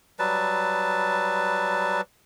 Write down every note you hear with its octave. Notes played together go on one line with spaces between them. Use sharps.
F#3 G3 B4 A5